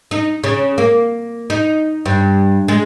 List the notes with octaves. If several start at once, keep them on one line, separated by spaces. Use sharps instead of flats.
D#4
C#3
A#3
D#4
G2
G#3